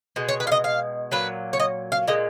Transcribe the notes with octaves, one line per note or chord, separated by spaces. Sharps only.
B2 G#3
C#5
B4
F5
D#5
F5
A#2 F#3 B4
C#5
D#5
F5
A#2 G#3 D#5